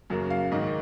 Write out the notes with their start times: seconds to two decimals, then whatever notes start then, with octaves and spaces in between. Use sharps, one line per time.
0.10 F#2 C#3 F#3 A#3
0.30 F5
0.51 G#2 D#3 A#3 D#5